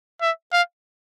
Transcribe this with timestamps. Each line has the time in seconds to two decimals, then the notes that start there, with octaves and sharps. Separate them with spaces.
0.21 E5
0.52 F5